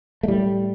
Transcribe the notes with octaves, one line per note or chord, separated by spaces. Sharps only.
A3
A2 G3